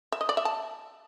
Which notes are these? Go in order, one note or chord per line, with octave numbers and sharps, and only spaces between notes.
E5
D#5
D5
E5
A5